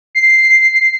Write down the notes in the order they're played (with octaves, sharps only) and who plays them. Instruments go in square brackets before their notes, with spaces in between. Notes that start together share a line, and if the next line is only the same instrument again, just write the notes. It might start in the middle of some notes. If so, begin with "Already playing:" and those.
[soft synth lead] C7